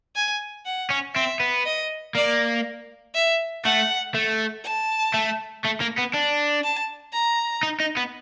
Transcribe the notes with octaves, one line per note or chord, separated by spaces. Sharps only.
G#5
F#5
C#4
C4 E5
B3
D#5
A#3 D5
E5
A3 F#5
A3
A5
A3
A3
A#3
B3
D4
A5
A#5
D#4
D#4
B3